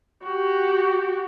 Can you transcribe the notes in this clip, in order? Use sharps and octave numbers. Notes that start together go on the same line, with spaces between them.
F#4 G4